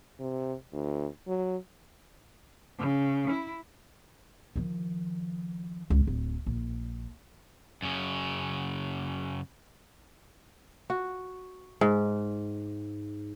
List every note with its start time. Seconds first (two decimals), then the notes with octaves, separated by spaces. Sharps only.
0.20 C3
0.73 D2
1.27 F#3
2.79 C#3
3.30 E4
4.56 D#3 F3
5.90 C#2
6.07 D1
6.46 A#1
7.82 F#2 C#3
10.90 F#4
11.81 G#2